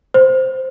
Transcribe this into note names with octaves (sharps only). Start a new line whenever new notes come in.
C5